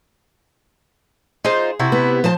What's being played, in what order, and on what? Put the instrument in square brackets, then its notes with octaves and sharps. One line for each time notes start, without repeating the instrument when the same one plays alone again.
[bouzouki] D#4 F4 C5 [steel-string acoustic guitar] G#4
[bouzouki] C3 E4 F#4
[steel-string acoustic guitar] B3
F3 C5 A5